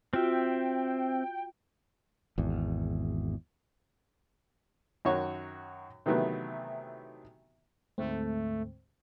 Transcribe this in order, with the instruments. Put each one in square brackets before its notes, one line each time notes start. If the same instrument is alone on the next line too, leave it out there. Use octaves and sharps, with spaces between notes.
[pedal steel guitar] C4 E5 [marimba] F4 F#4 [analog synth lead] G5
[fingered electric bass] G#1 E2
[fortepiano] F#2 D#3 F#4 C#5 C#6
C3 D#3 E3 F#3 A3 B3
[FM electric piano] D2 G#2 C4 [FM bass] A3